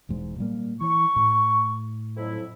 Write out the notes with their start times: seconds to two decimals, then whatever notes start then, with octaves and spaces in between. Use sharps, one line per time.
0.09 E1 E2 G#2
0.38 A#2 G3 A#3
0.81 E3 C#6
1.16 A2
2.16 F2 F#3 E4